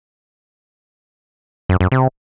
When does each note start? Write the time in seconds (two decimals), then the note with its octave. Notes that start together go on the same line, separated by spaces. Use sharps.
1.69 F#2
1.81 F#2
1.92 C3